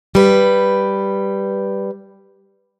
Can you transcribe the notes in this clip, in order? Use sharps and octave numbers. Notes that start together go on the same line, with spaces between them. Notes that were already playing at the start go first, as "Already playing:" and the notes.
G3 B4